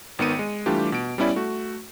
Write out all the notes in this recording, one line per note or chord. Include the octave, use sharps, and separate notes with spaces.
G#1 D#3 B3 C#7 D#7
G#3
E3 G3 A3 D4 F4 G4
B2 D7
G3 B3 C#4 E4 D5
A3 F#4